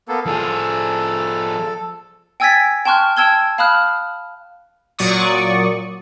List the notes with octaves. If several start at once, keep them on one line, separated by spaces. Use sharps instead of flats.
A#3 B3 A4
F3 G#4 A4
G5 G#5 E6 G#6 A6 B6
G5 A5 C6 C#6 F6 F#6
G5 A5 E6 G#6 G7
F5 A5 B5 D#6 F6 F#6
A#2 F#3 D5 C#6 D#6